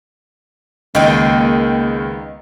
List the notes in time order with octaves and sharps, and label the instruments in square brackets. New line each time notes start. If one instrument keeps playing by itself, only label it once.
[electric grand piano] C#2 D#3 G5 [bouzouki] G#3 B3 D#4 [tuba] A#3